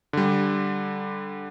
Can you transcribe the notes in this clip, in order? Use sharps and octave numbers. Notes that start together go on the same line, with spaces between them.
D3 G3